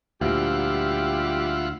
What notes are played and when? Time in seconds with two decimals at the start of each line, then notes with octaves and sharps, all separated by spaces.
0.21 D2 A#2 G3 E4 F4 G4 F#5